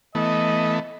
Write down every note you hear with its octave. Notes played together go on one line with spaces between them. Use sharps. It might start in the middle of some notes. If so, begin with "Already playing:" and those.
E3 A3 B3 D#5